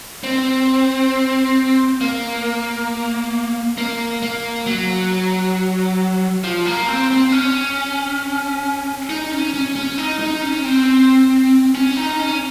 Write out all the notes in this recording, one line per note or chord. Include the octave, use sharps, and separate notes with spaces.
C4
A#3
A#3
A#3
F#3
F3
A#3
C4
C4
C#4
D#4
C#4
C#4
C#4
D#4
D#4
C#4
C4
C#4
D#4
C#4